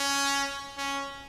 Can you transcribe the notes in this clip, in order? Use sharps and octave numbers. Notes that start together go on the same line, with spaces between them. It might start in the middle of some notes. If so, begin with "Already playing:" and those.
Already playing: C#4
C#4